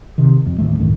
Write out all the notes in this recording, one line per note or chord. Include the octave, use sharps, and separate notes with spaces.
C3 D#3
F2
D#1 A1 D#2 A3
C#2 F#2 A2 D#3